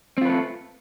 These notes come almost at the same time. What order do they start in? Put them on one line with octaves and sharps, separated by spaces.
C4 F4 B4 A3